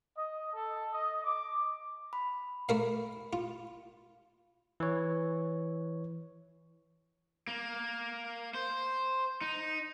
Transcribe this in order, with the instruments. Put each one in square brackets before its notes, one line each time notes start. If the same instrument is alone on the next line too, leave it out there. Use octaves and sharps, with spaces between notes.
[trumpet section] D#5
A4
D#5
D6
[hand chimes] B5
[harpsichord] A3 A#4 F5
F4
[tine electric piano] E3 C#5
[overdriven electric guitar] A#3
C5
D#4